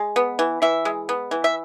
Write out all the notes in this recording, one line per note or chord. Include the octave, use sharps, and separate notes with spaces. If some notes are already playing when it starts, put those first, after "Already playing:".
Already playing: G#3
B3
E3
E3 E5
G#3
B3
E3
E5